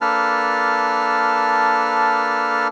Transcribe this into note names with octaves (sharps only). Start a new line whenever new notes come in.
A#3 D4 A4 B4 A5 F6